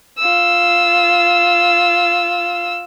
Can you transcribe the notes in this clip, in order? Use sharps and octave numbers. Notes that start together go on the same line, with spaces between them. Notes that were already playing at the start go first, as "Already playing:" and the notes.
F4 E6